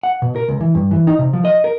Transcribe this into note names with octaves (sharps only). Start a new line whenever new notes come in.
F#5
B2
A#4
C#2
E3
G2
E3
D#4
C3
F3
D#5
A#4